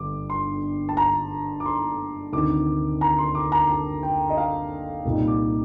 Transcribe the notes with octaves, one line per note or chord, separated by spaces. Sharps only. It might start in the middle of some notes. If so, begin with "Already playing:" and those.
Already playing: G1 G2 D3 G3 D6
C6
A5
A#5
D6
C6
D2 C3 D#3 D6
A#5
C6
D6
A#5
A5
G5
D#5
F5
C2 A#2 G3 A#3 D#4
D6